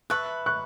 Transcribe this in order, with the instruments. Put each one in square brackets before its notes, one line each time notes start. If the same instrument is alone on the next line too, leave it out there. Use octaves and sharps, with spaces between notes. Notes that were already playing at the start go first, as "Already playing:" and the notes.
[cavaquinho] B4 E5 A5 [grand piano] C#6 F#6
[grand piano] C#6 F#6